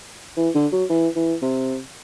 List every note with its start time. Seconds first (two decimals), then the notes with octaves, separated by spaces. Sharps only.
0.37 E3
0.55 D3
0.72 F#3
0.89 E3
1.16 E3
1.42 C3